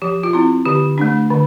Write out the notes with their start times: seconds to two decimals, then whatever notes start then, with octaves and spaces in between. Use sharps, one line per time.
0.02 F3 G4
0.23 F4
0.33 C4 E4
0.66 D3 G4
0.98 A3 D4
1.30 D3